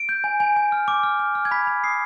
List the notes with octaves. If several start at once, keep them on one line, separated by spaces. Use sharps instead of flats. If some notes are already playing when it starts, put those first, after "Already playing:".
Already playing: D7
G6
G#5
G#5
G#5
F6
D6
F6
F6
F6
G#6
B5 B6
B5
D#6 C7